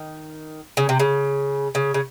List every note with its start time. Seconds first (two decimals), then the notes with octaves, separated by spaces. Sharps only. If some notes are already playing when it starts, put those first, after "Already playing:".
Already playing: D#3
0.77 C#3
0.89 C3
1.00 C#3
1.75 C#3
1.94 C#3